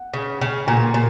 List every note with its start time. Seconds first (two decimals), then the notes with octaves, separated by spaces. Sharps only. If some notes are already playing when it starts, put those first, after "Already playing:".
Already playing: F#5
0.14 C#3
0.41 C#3
0.67 A#2 G#5
0.94 A#2